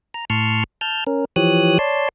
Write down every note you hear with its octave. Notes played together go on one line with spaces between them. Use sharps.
A#5
A2 A5 C6 C#6 F6
A5 F6 G6
C#4 A#4
E3 F3 G4 C#5 D#6 F#6
C#5 D5 A5 C6